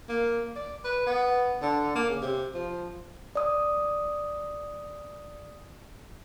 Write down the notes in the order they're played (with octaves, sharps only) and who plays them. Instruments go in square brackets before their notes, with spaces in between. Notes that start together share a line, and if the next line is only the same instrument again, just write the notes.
[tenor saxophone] A#3
D5
B4
B3
D3
A#3
C#3
C3
F3
[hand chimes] D5 D#6